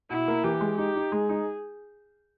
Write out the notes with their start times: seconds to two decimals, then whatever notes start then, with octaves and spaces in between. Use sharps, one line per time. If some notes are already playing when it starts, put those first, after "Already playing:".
0.10 B2 E4
0.28 A#3
0.44 E3 G4
0.61 G#3
0.78 D#4 G4
0.96 D#4
1.12 G#3 G#4
1.29 D#4